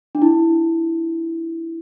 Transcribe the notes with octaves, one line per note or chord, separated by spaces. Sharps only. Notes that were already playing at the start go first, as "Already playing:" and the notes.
D4
E4